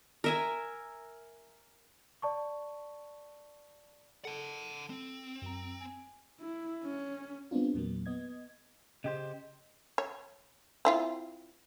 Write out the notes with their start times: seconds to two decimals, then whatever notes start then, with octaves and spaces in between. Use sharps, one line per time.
0.24 A#4 E5 G#5
2.22 D5 A5 C#6
4.25 A4 F#5 A5
4.90 C4
5.42 F#2 A#5
5.81 G#5
6.40 E4
6.84 C#4
7.51 G3 B3 C4 D4 F4
7.74 E2 A#2 F#3 A#3
8.06 B3 D#5 G#6
9.04 C#3 G4 C5 D#5
9.98 C#5
10.85 C4 E4 F4